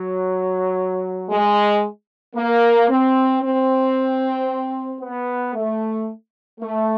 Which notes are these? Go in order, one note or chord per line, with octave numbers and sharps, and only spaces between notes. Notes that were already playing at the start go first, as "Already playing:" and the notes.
Already playing: F#3
G#3
A#3
C4
C4
B3
A3
A3